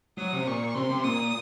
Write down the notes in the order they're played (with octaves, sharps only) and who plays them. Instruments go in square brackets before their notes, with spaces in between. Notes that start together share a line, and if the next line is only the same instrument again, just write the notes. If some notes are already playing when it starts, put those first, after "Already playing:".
[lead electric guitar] F#3 [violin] D#6
[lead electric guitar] C3
[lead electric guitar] A#2 [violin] C#6
[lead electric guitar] C3 [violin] C6
[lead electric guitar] C3
[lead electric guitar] A#2 [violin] D#6